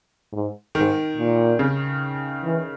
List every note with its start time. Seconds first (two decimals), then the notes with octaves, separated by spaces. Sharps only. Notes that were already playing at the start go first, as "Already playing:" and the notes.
0.32 G#2
0.75 G#2 D#3
1.17 A#2
1.59 C#3
2.44 E3